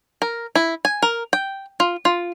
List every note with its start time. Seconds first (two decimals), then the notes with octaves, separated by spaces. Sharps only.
0.22 A#4
0.55 E4
0.85 G#5
1.02 A#4
1.33 G5
1.80 F4
2.05 F4